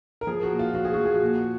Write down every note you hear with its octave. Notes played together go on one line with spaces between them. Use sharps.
A#4
F3 G#4
F#4
A#2
F4
F3 F#4
G#4
F3 F#4
G#4
F#4
A#2